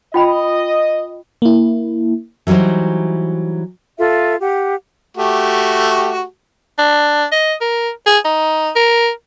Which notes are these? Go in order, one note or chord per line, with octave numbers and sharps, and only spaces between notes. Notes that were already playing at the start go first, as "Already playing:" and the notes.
F4 D#5 G5 B5
A#3 E4
E3 F#3 G3 D#4 C5
F4 A4 E5
G4 F#5
A3 F#4 G4
D4
D#5
A#4
G#4
D#4
A#4